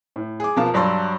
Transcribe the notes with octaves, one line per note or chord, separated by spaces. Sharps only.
A2
G#4 D6
B2 F3 A#4 F5 A5
G2 F#3 D5 A5 C6 E6